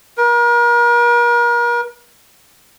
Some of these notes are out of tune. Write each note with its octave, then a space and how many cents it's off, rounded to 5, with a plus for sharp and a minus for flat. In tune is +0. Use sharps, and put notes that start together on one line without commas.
A#4 +40